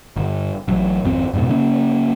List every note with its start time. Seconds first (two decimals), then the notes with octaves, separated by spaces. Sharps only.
0.16 G1
0.68 A1 F#3
1.05 G#1 F2 C4
1.33 F2 G#2 B2
1.49 C#3 A#3 C#4